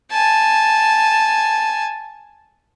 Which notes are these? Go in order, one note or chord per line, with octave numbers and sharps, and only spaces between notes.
G#5 A5